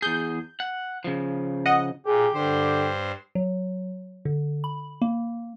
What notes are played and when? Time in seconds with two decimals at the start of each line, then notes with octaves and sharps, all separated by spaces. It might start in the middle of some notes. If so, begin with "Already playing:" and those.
0.02 E2 G#4 G6
0.60 F#5
1.04 C#3 F3
1.66 D#5 F#5
2.06 A#2 G4 G#4
2.34 G2 D3 C5
3.35 F#3
4.25 D3
4.64 B5
5.02 A#3